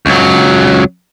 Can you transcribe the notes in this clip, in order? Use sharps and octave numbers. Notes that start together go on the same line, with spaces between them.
C#2 F#3